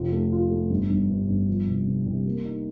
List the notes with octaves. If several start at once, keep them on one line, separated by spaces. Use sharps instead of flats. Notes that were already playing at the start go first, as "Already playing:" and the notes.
Already playing: F1 F4
A3
F4
A3
G1
G1
G2
G1
F3
C2
C3
C2
A#3
D#4